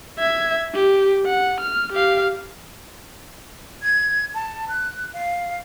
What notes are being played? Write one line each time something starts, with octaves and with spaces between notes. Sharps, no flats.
E5 G#6
G4
F#5
F6
G4 F5
G#6
A5
F#6
F5